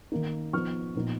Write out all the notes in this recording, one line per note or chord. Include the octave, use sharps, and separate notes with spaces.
D#3 A#3 D#4
F3 B3 D#4 C#6 F6
A#2 F3 B3 D#4